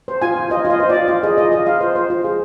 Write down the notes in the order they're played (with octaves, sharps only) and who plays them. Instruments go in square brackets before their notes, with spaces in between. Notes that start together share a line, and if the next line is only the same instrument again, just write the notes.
[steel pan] C5
F4 G#5
F4
F4 D#5
F4
D#5
C5
F4 D5
F4
G#4 D#5
F4 D#5
F4 D#5
F4 F5
C5
C5
F4
G#4